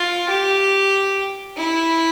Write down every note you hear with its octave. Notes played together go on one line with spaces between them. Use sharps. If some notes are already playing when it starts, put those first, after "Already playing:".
Already playing: F4
G4
E4